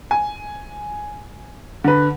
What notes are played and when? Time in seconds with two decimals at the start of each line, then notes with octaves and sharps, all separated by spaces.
0.11 G#5
1.84 D3 B4